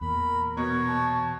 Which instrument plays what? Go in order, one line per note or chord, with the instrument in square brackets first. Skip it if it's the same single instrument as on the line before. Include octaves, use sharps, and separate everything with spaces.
[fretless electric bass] E2 A#2 [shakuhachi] A#4 [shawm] B5
[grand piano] B2 [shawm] C#5
[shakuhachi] A5